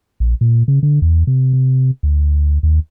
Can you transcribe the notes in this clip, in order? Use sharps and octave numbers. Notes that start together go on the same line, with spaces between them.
A#1
A#2
C#3
D3
E2
C3
C3
D2
D#2